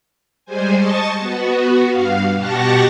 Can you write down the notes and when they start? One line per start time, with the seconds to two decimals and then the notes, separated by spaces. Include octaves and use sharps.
0.45 G3 G#3 C5 G#5
0.75 D#5 A5 C#6 A6
1.19 B3 F#4
1.87 G2 F5
2.34 B2 G4 F#5 A5 C#6 A#6